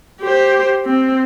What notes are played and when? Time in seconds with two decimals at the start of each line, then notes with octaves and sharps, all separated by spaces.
0.20 G4 C5
0.85 C4